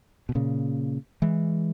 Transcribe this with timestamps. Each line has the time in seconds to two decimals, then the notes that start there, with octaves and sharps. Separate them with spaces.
0.29 B2
0.35 A#2 C#3
1.22 E3 G#3